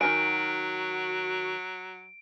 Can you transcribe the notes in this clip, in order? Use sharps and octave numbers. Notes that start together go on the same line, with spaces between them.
D#3 F#3 F#4 A#4 G#5 D7